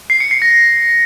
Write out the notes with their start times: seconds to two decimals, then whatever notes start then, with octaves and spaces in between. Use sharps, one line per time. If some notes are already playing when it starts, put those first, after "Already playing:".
0.10 C7
0.20 C#7
0.31 C7
0.42 A#6